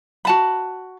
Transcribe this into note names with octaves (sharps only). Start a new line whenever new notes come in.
F#4 A5 B5